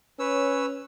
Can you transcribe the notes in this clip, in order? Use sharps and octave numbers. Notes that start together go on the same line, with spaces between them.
C#4 B4 C#5 E6